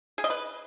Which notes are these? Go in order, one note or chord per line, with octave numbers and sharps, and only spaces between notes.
G#4
D#5
B4